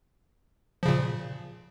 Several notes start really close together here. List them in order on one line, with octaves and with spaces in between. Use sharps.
F3 C#3 A#2